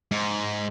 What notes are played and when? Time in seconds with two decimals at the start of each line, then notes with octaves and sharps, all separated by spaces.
0.12 G#2